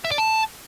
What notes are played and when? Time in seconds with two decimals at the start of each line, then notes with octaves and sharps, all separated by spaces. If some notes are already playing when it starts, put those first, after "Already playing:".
0.05 E5
0.11 D5
0.18 A5